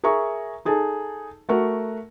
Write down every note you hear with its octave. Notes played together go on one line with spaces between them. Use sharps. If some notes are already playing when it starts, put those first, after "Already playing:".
G#4 A#4 E5 A#5 C#6
D#4 G#4 A4 A5
A3 F#4 A#4